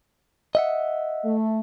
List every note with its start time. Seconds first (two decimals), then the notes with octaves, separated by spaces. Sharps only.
0.55 D#5 E5 F#5
1.25 A3